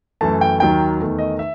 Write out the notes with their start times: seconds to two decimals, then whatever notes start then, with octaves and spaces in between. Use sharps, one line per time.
0.21 F#2 E3 A3 A5
0.41 G5
0.60 D#2 D#3 F#3 G5
1.00 E2 D#3 A3
1.19 D#5
1.39 E5